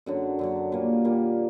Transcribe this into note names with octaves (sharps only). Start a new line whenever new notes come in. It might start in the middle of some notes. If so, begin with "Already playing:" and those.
F#2 D3 F#3
F#2 D3 F#3
A#2 G3 A#3
A#2 G3 A#3